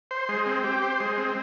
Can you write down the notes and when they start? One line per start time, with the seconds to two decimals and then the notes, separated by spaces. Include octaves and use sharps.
0.11 C5
0.29 G#3
0.46 C4
0.64 G4
0.82 C5
1.00 G#3
1.18 C4